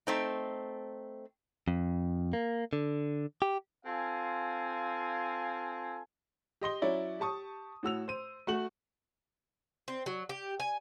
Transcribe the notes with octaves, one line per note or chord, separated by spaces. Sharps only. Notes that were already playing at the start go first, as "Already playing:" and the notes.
A3 C4 D#4
F2
A#3
D3
G4
C4 F4 A4 F5 G#5
G4 D#5 C6 G7
F#3 C#4 E4 D5
G4 A5 C#6 D#6
A2 F#4 E6 F7
C5 D#7
A3 F#4 F#7
C4
F#3
G4
G#5